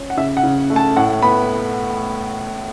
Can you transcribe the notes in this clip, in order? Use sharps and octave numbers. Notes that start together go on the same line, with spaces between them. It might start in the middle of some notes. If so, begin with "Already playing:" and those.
Already playing: C#4
F#5
C#3 E5
F#5
C#3
A3
A5
A2 F#5
B3 B5